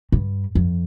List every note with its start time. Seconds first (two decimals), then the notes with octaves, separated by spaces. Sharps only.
0.12 G2
0.55 F2